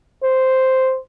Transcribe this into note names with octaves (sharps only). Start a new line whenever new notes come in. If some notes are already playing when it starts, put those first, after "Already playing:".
C5